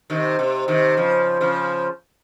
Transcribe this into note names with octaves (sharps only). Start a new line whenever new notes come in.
C3 D#3
C3
C3 D#3
C#3 F3
C#3 F3